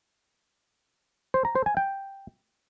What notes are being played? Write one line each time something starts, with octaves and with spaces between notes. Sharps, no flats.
C5
A#5
C5
G#5
G5